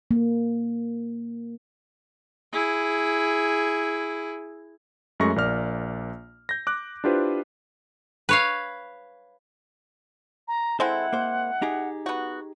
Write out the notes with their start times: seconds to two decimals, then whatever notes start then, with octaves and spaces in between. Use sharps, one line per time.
0.11 A#3
2.52 E4 G#4
5.20 F#2 G#3 A3 C#6 A#6
5.36 A#1 A#3 D5 F6
6.49 G6 A#6
6.67 D6 F#6
7.04 D4 E4 F4 G4 B4 C5
8.29 B4 C#5 F5
10.48 A#5
10.80 G#3 C4 E4 A4 C5 F#5
11.13 A#3 C5
11.62 D#4 G4 G#4
12.06 B3 F#4